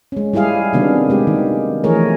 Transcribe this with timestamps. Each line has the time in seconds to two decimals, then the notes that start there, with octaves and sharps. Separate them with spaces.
0.12 G#3 C#4
0.33 G3 E4 G4 G#4 F5
0.73 C3 D#3 F#3 B3 D4
1.10 G#3 G4
1.27 D#3
1.84 E3 F3 A3 G#4 A#4 C#5